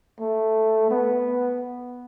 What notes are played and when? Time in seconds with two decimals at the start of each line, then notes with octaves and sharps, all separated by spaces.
0.20 A3
0.91 B3